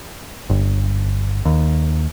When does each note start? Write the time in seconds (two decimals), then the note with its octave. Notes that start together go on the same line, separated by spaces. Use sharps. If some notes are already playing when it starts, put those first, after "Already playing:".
0.50 G1
1.45 D#2